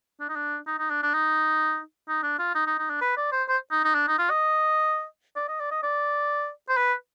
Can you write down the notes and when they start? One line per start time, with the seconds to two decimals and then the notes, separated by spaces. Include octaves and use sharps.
0.20 D4
0.29 D#4
0.36 D4
0.67 D#4
0.79 D#4
0.90 D4
1.03 D4
1.14 D#4
2.08 D#4
2.23 D4
2.39 F4
2.55 D#4
2.67 D#4
2.78 D#4
2.90 D4
3.01 B4
3.17 D5
3.32 C5
3.49 C5
3.71 D#4
3.84 D#4
3.95 D4
4.08 D#4
4.18 F4
4.30 D#5
5.36 D5
5.48 D#5
5.60 D5
5.71 D#5
5.83 D5
6.69 C5
6.77 B4